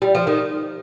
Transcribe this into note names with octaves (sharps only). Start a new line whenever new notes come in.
G3
F3
D#3